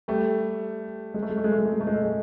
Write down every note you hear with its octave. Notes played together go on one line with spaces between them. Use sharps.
G3 A3
G#3
A3
G#3
A3
G#3
A3
G#3
A3
G#3
A3
G#3
A3
G#3